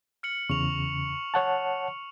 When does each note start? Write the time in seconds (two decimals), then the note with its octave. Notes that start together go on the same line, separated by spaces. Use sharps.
0.23 F6 C#7 F#7
0.49 E2 C#3 C#6 F7
1.34 C#5 F#5 A5